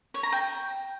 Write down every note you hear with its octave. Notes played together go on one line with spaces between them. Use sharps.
C#5
A#5
G5